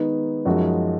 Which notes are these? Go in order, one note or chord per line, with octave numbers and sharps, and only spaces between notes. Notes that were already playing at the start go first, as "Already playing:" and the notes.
Already playing: D#3 G#3 B3 D#4
F#2 F3 G#3 D#4 F#4